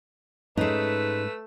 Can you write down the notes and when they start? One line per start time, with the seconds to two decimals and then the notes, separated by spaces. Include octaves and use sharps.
0.57 G#2 G#3 A3 C#4 D#4 B4 E6